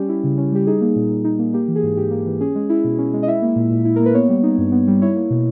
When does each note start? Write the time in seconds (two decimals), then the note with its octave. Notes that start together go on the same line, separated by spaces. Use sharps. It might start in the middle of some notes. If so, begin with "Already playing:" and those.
Already playing: G3 C#4 G4
0.09 E4
0.24 C#3
0.38 C#4
0.52 G3 G4
0.67 D#4 G#4
0.81 A#3
0.96 A#2
1.10 A#2
1.25 D#4
1.39 A#3
1.54 A#3 G4
1.68 E3
1.76 G#4
1.83 G#2
1.97 G#2 G4
2.11 A#3
2.26 E3
2.41 C#4 G#4
2.55 G#3
2.69 E4
2.84 B2
2.98 C#4
3.13 G#3
3.23 D#5
3.28 E4 E5
3.42 A#3
3.56 A#2
3.71 A#2
3.85 E4
3.96 A#3 A#4
4.06 B4
4.14 B3 C#5
4.29 G3
4.43 D#4
4.58 G2
4.72 B3
4.87 G3
5.02 E4 C#5
5.16 A#3
5.30 B2